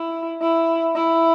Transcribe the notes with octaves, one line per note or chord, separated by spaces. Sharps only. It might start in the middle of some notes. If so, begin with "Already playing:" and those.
Already playing: E4
E4
E4